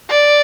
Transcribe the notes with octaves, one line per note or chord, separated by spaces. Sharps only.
D5